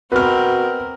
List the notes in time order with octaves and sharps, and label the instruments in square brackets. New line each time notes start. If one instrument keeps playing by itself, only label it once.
[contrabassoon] B2 [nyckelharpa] C4 A#4 [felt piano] B4 F6